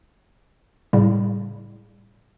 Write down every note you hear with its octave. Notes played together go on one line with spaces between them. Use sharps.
A2 C#3 G3